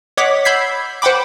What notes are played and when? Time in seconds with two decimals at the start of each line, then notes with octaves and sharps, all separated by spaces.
0.17 C#5 D#5 F#5 D6 B6
0.45 B5 E6 G6 G#6 B6 C7
1.02 C5 F#5 G5 B5 D6